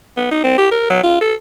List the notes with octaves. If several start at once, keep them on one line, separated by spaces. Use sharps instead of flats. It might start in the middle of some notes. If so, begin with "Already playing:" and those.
B3
D#4
C4
G4
A#4
F#3
F4
A4